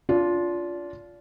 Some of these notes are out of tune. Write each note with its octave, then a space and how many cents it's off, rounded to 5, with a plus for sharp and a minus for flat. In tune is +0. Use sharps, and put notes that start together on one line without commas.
D4 -30 F4 +0